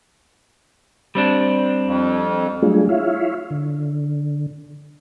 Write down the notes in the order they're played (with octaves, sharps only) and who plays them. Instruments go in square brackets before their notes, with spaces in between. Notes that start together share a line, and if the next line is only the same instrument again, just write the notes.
[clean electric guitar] G3 C4 D4
[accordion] F2
[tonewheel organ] F#3 G3 A3 D4 F4 G#4
E4 F4 C#5 E5 F5
D3